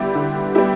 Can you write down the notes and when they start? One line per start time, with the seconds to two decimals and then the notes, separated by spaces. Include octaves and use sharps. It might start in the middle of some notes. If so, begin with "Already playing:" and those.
Already playing: D3 G3 B3 E4 G4
0.15 D3
0.55 G3 B3 E4 G4